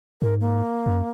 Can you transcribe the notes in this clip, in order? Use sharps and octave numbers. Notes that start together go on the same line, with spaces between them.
G#2 A#4
A#3
F#2